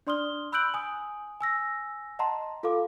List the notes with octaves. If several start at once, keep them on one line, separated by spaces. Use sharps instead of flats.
D4 D5 C6 D#6 F6 G7
B5 E6 F#6 G6 D7 F#7
G#5 D#6
G#5 E6 A#6
D#5 F#5 A5 A#5 C6
F4 A4 F5 D6